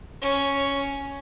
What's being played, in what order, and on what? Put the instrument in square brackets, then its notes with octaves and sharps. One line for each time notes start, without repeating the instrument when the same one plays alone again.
[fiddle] C#4